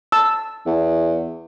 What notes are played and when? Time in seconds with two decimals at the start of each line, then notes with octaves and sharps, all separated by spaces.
0.12 A5 E6
0.66 E2